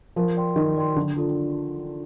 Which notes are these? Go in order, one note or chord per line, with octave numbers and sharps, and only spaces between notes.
F3 A#4
D5 G5 C6
D#3 A#4
D5 G5 C6
D3 D4
F4 A4 D5